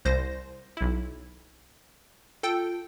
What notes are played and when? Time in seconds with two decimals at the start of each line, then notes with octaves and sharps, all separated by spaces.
0.05 C2 C5 A#6
0.77 B1 E4
2.43 F4 A4 G5